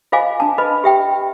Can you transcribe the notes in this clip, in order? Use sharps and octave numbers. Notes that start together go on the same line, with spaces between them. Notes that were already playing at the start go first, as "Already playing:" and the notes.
F4 C5 D#5 F5 G#5 D6
D4 A5
B4 D#5 B5
G4 E5 G5